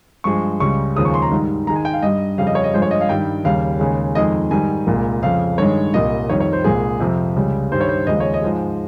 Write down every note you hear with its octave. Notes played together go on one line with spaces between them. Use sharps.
G2 F3 G#3 C#6
C#2 C#3 G3 C#6
D#2 C#3 F3 G#3 D#6
C#6
C6
A#5
G#2 D#3 G3
G#2 D#3 G#3 A#5
G#5
G5
F5
G2 G3 D#5
F2 C#3 G3 F5
D#5
C#5
D#5
G2 F3 G#3 C5
C#5
D#5
F5
G2 D#3 G3 G5
D#2 C#3 G3 F5
D#2 C#3 G#3
F2 D#3 G#3 D#5
G#2 D#3 G3 G#5
C2 A#2 G#3
F2 C#3 F3 F5
G2 D#3 G#3 C#5
C2 A#2 G3 D#5
F2 D#3 G3 C#5
C#5
C5
C2 A#2 G#3 G#4
F2 C3 F3
C#2 C#3 G3
G2 D#3 G3 C5
C#5
C5
D#2 C#3 F3 G#3 D#5
C#5
D#5
G#2 F3 G#3